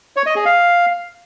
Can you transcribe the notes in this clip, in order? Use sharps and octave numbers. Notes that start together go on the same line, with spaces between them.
C#5
D#5
G#4
F5